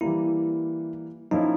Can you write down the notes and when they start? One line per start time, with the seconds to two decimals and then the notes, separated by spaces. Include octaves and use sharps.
0.01 E3 G3 A#3 E4
1.31 F3 A#3 C#4 D#4 E4